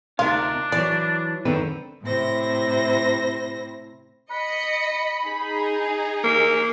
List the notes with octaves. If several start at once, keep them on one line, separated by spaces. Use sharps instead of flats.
D2 C3 D4 D#4 F4 A#4 F5
E3 F#3 D5
F#2 D3 D#3 C4 B4
A2 C3 E4 C5 A#6
D#5 B5 C#7
D#4 G#4
A#3